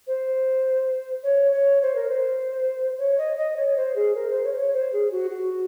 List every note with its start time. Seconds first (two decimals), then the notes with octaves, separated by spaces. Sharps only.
0.07 C5
1.23 C#5
1.52 C#5
1.82 C5
1.96 A#4
2.08 C5
2.98 C#5
3.18 D#5
3.37 D#5
3.56 C#5
3.76 C5
3.96 G#4
4.15 A#4
4.30 C5
4.44 C#5
4.52 C5
4.59 C#5
4.73 C5
4.93 G#4
5.12 F#4
5.31 F#4